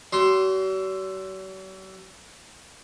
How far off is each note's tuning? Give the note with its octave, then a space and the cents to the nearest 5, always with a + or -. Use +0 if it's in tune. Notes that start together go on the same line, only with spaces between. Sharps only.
F#3 +45 C6 +0